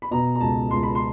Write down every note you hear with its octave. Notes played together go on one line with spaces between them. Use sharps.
B5
B2 A#5
A#5
C#2 A5
C#2 C6
B5
C6